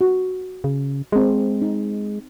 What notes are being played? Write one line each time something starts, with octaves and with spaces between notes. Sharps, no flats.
F#4
C#3
G#3 C4 G#4
D#4